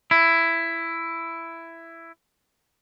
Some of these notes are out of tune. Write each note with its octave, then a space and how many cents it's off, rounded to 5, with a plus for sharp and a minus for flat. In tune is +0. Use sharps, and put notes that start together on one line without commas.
E4 +10